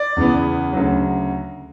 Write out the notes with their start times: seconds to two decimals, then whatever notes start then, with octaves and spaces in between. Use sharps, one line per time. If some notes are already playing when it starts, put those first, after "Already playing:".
Already playing: D5
0.16 E2 C#3 E3 B3
0.73 D2 C#3 F#3